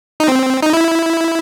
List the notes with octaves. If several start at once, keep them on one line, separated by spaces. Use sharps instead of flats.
D#4
C4
D#4
E4